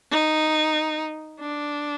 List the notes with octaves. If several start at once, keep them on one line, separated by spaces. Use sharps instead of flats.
D#4
D4